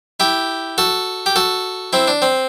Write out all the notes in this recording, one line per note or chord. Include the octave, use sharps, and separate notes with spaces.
E4 G4
F#4 A4
G4
F#4 A4
C4 E4
D4
C4